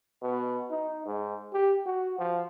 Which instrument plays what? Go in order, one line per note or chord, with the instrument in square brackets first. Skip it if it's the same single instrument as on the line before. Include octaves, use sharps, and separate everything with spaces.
[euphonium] B2
D#4
G#2
G4
F#4
F3